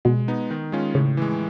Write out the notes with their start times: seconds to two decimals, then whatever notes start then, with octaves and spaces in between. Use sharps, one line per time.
0.05 B2 G#3
0.28 B3 D#4
0.51 D#3
0.72 G#3 C#4 F4
0.95 A2 C#3
1.17 E3 G#3